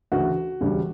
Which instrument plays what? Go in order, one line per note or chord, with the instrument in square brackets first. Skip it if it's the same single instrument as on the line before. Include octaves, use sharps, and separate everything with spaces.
[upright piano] D2 C#3 E3 A3 D4 F#4
E1 D2 C#3 G3